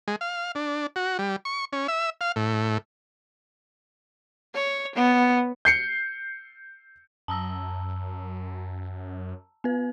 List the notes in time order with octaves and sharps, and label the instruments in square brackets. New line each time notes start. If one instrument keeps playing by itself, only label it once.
[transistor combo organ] G#3
F5
D4
F#4
G3
C#6
C#4
E5
F5
A2
[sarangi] C#5
B3
[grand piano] G6 C7 C#7
[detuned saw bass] F#2 [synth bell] A5 A#5 E6
[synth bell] B3 B4